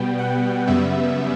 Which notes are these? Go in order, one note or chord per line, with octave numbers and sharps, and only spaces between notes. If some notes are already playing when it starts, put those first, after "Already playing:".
Already playing: B2 G3 B3 G5
F#5
F#2 C#3 G3 B3 E5